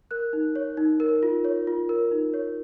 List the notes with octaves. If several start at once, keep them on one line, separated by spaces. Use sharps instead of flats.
A#4 F#6
D#4
C#5
D#4
A#4
F4
C#5
F4
A#4
D#4
C#5